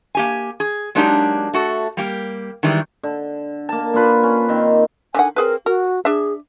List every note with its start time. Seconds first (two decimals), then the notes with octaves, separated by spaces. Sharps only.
0.15 A#3 G4 G#5
0.60 G#4
0.95 F#3 G#3 A#3 D4 D#4 G4
1.54 A3 F#4 A4
1.97 G3 A#3 G4
2.63 D#3 E3 G3 G#3
3.03 D3
3.69 A#3 A5
3.94 A#3 D4 F4 B4
4.23 C#4
4.49 D#3 C4
5.15 D3 D#3 F#5 G#5
5.36 C4 G#4 A#4 B4
5.66 F#4 A#4
6.05 D4 G#4 E5